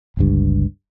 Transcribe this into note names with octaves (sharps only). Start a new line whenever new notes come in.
G1 C#2 G2